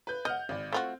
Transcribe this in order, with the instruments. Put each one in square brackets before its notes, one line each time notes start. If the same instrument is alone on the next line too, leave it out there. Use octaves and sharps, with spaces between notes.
[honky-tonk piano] B4 G6
[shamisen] D#5 [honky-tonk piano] F#5 F6 G6
[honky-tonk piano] G#1 D5
[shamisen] A3 F4 F#4 [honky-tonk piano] C4